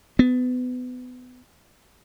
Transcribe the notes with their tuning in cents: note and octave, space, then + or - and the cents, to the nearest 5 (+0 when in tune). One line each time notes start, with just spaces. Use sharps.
B3 +25